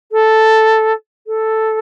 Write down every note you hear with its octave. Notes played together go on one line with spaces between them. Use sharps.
A4
A4